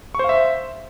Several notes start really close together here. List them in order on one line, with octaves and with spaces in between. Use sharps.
C#6 C5 F5 E5 C6